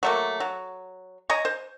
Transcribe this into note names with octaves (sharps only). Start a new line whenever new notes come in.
F#3 A3 A#3
F#3
C#5 D#5 G#5 A#5
C5